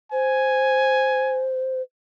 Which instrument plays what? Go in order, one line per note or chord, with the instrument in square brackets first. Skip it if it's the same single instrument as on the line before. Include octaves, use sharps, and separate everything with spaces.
[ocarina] C5 [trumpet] G#5